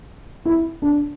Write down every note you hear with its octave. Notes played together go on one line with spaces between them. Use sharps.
E4
D4